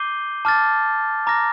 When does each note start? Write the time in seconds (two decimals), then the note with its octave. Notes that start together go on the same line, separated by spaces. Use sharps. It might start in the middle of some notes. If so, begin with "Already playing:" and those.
Already playing: D6 G6 C7 D#7 G7
0.45 A5 D6 F6 A6
1.27 A#5 D6 F6 A#6